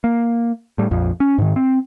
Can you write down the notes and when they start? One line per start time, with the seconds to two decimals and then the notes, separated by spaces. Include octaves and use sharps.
0.04 A#3
0.78 A2 G3
0.91 A#1 F2 F3
1.20 C#4
1.38 G#2 D#3
1.56 C4